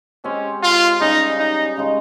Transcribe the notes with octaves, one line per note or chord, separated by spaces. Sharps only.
G#3 C4 C#4 G4
F4
C#3 G3 C#4 D#4 G#4
D#4
C#3 G#3 D#4